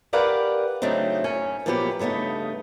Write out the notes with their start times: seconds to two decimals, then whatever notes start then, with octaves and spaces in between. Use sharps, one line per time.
0.13 G4 A#4 B4 D5 F5 F#5
0.82 C#3 F#3 A3 C4 D4 D#4
1.24 F#2 C#4 G#5
1.66 A#2 F3 F#3 A#3 B3 G4
1.99 G2 C#3 A3 B3 D#4